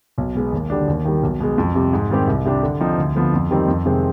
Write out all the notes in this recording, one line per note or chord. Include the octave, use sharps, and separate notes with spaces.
B1
B2 G#3 B3
D#2
D3 G3 D4
D#2
D#3 G3
B1
B2 G#3
F2
C3 G3
G#2
D#3 G3 C4 G4
C2
C3 G3 D4 G4
D3
F3 C4 D#4
D2
D3 F3 B3
F2
D#3 G3 C4 D#4
F2
C3 D#3 G#3 C4